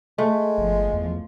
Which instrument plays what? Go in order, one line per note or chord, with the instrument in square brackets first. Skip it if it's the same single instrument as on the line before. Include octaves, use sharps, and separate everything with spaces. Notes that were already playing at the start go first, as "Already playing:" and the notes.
[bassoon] G#3 [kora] A3
[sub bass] G1 [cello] F3
[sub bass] E2